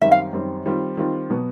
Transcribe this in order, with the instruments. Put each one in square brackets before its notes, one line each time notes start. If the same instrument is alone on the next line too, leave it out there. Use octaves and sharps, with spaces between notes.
[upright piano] F#2 D#3 G3 C4 [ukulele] E5
[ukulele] F5
[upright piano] F#2 D#3 G3 C4
D#3 G3 C4 F4
D#3 G3 C4 F4
B2 F#3 B3